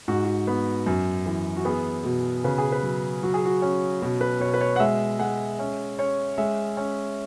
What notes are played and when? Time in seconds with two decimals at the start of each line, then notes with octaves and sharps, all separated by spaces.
0.08 G#2 F#4
0.24 F#4
0.47 B3
0.86 F#2
1.26 E3
1.56 F#4
1.65 B3 G#4
2.04 B2
2.44 C#3 B4
2.58 G#4
2.72 B4
2.83 F#3
3.23 F#3 F#4
3.34 G#4
3.45 F#4
3.62 C#4
4.02 B2
4.21 B4
4.40 B2 C#5
4.54 B4
4.61 C#5
4.76 F#5
4.80 G#3 E5
5.19 G#3 F#5
5.59 C#4 E5
5.99 C#4 C#5
6.38 G#3 E5
6.77 C#4